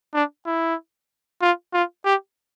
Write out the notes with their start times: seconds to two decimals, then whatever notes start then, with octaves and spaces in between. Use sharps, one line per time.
0.14 D4
0.46 E4
1.41 F4
1.73 F4
2.05 G4